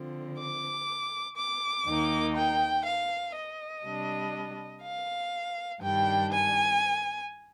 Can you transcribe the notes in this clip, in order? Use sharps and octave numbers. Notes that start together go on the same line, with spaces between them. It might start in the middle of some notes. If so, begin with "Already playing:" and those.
Already playing: D3 F3 C4
D6
D6
D#2 D#3 A#3 D#4
G5
F5
D#5
C3 G3 D4
F5
G2 D#3 G3 D4 G5
G#5